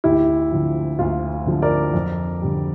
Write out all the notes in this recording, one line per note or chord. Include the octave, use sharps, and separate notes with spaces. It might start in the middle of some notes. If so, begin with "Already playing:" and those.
D2 E4 G4
D3 F3
D2 F4
D3 F3
A#4 D5
F2
D3 G3